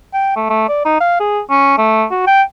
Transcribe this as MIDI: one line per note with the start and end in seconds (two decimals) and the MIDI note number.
0.14 0.34 79
0.36 0.46 57
0.50 0.65 57
0.68 0.85 74
0.85 0.99 63
1.00 1.16 77
1.20 1.40 68
1.50 1.78 61
1.78 2.05 57
2.11 2.23 66
2.27 2.42 79